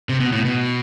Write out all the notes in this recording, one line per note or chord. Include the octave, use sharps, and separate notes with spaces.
C3
B2
A2
B2